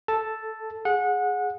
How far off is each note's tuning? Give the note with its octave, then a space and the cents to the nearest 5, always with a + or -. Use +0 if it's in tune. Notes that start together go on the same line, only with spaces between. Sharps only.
A4 +0 A5 +0
G#4 +5 F#5 -25